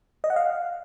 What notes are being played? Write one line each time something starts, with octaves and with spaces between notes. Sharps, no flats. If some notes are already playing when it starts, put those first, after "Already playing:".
D#5
F#5
F5